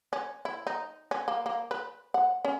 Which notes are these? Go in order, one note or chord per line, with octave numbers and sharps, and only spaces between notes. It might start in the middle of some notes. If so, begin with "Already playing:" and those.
C#4
E4
D#4
C#4
A#3
A#3
B4
F#5
C#4